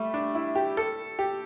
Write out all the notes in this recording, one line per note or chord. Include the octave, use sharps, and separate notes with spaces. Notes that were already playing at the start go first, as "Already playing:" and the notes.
Already playing: G3 A3
D4
E4
G4
A4
G4